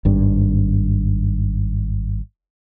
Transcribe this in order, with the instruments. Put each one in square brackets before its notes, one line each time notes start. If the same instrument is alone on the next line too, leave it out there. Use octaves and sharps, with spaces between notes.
[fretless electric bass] G#1 G2